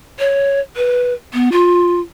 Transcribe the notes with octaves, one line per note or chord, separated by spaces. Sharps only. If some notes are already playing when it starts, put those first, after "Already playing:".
C#5
B4
B3
F4